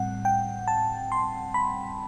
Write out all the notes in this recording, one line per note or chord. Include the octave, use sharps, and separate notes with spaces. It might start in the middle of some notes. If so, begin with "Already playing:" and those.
Already playing: A2 G3 C4 F#5
G5
A5
C6
B5